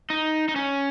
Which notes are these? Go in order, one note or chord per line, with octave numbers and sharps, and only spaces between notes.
D#4
D#4
C#4